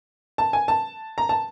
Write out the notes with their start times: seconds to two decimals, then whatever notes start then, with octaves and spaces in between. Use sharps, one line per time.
0.38 A5
0.53 G#5
0.68 A5
1.18 A#5
1.29 A5